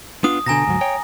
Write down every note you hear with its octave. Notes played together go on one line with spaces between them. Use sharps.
B3 D4 F4 D#6
B2 D3 G#5 A#5 A#6
D2 G#2 F#3
C#5 G5